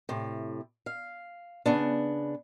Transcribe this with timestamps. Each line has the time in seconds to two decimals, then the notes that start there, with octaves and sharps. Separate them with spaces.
0.09 A2 C3
0.86 F5
1.66 C#3 B3 D4